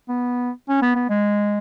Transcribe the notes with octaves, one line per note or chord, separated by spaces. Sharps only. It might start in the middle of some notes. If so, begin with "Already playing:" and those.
B3
C#4
B3
B3
G#3